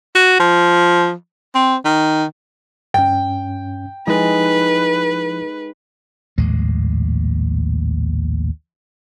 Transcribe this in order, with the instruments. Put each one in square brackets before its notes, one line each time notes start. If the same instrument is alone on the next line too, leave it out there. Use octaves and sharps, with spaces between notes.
[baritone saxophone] F#4
F3
C4
D#3
[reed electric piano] G2 C#4 [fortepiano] G5
[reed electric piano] F3 E4 [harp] G#3 D#4 A4 [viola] B4
[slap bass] A#1 D#2 A2 G#3